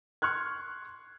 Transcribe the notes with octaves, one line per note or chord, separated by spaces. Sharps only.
C6 C#6 F6 F#6 G#6